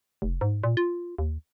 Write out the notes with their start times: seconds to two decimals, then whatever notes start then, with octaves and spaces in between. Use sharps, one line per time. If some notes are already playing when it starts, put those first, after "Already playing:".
0.22 F1
0.41 G#2
0.64 A#2
0.77 F4
1.18 D#2